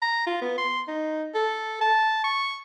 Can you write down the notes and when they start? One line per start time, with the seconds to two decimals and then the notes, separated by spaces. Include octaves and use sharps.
0.02 A#5
0.27 F4
0.41 B3
0.58 C6
0.87 D#4
1.34 A4
1.81 A5
2.24 C#6